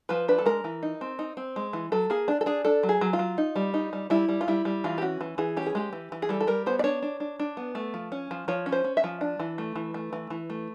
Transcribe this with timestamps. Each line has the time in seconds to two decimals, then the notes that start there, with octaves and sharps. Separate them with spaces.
0.09 F3 B4
0.28 D4 B4
0.38 A4
0.46 G#3 A#4
0.64 E3
0.83 D#4
1.01 C4
1.19 D#4
1.37 C4
1.56 G#3
1.73 E3
1.92 F#3 A4
2.10 A#3 G#4
2.28 D4
2.41 A4
2.46 D4 G#4
2.65 D4 A4
2.83 F#3
2.89 G#4
3.01 F#3
3.13 F4
3.19 F#3
3.38 D#4
3.56 G3
3.74 D#4
3.93 G3
4.10 G3 E4
4.29 G3
4.41 F4
4.48 G3 E4
4.65 G3
4.84 E3 F4
4.98 G4
5.02 C#4 F#4
5.21 E3
5.38 E3 G#4
5.57 C#4 G4
5.66 G#4
5.75 G#3 G4
5.93 E3
6.12 E3
6.22 G#4
6.29 G3 A4
6.41 A4
6.47 G3 A#4
6.66 B3 C5
6.79 D5
6.84 D4 C#5
7.02 D4
7.20 D4
7.39 D4
7.57 B3
7.75 A3
7.94 F3
8.12 C#4
8.31 F3
8.48 F3 C#5
8.66 C#4
8.72 C5
8.84 C#4
8.97 E5
9.04 F3
9.21 D4
9.40 E3
9.58 A3
9.76 E3
9.94 A3
10.13 E3
10.30 E3
10.50 A3